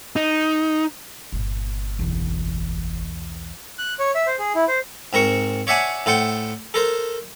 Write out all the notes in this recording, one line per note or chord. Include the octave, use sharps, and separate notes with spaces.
D#4
G1 A#2
B1 E2
F#6
C#5
E5
C5
G#4
E4
C5
G#2 C4 A#4 C#6
C#5 D5 E5 F#5 G#5 A5
A2 A4 C5 F#5 G5
A4 A#4 C5